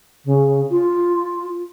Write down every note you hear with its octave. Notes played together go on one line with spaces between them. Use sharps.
C#3
F4